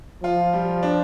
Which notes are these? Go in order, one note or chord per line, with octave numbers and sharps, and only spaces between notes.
F3 F4
G3
D4